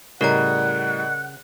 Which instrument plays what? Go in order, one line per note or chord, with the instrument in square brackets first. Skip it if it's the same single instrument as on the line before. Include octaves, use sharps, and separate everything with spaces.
[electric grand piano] A2 G3 D#5 [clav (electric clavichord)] C#3 [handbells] A#4 D5 A#5 [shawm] F#5